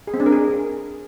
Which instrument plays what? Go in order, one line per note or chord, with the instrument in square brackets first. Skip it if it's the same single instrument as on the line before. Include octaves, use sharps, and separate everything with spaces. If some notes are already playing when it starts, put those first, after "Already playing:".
[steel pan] G#4
C4
D4
A#4
G#4